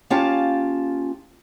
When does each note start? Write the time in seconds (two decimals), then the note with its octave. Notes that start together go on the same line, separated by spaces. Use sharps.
0.10 A#3 C#4 F4 G4 F5 A5